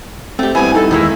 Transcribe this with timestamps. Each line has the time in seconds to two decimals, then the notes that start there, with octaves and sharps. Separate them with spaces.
0.39 A3 C4 G4
0.55 G2 B3 E4 G#5
0.75 D#4 A4
0.91 E2 D#3 G#3 A#3 E4